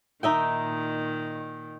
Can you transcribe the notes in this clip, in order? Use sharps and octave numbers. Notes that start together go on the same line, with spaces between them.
A#2 D#3 D#4 E5 G5